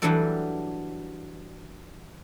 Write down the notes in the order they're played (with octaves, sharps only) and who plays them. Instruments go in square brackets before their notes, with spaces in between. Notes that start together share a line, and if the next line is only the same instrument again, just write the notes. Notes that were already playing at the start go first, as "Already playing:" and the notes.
[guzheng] E3 F#3 G3 D4 A4 D5